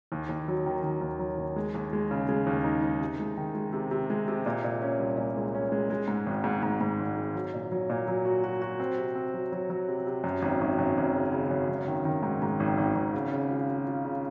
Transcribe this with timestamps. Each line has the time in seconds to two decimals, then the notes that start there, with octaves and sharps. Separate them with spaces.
0.12 D#2
0.29 D#2
0.48 F#3
0.66 D#3
0.83 D#3
1.01 D#2
1.19 F#3
1.38 D#2
1.56 G#3
1.74 D#2
1.93 G#3
2.11 C#3
2.29 G#3
2.46 D#2
2.64 D#4
2.82 D#4
3.00 C3
3.20 G#3
3.37 D#3
3.55 G#3
3.73 C3
3.91 C3
4.10 G#3
4.28 C3
4.46 A#2
4.64 A#2
4.82 C#4
5.00 C2
5.17 A#2
5.36 G#3
5.55 C#4
5.72 G#3
5.90 G#3
6.08 G#2
6.26 G#1
6.44 G#2
6.63 G#2
6.81 G#2
6.99 G#1
7.17 G#3
7.35 F#3
7.54 A#2
7.72 F#3
7.90 A#2
8.08 F#3
8.25 F#4
8.44 F#4
8.62 F#4
8.80 C4
8.98 C3
9.15 C4
9.34 F#3
9.52 F#3
9.70 F#3
9.88 C3
10.07 C3
10.24 F#2
10.42 G#1
10.61 G#1
10.79 F#2
10.97 G#1
11.14 C#3
11.32 C#3
11.51 F#2
11.69 G#1
11.88 D#3
12.05 D#3
12.23 G#2
12.42 G#2
12.60 G#1
12.78 G#1
12.95 G#1
13.14 C#3
13.32 C#3
13.50 F4
13.68 F4
13.87 F4
14.05 C#3